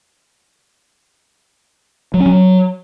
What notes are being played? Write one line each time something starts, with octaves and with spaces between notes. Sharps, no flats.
F#3
C#4
F#3